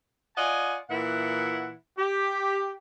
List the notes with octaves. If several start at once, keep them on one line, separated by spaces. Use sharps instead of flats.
F4 D5 D#5 F#5 G#5
A#2 E3 E4 F#5
G4